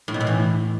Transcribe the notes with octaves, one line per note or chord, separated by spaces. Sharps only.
A2
B2
A2
E3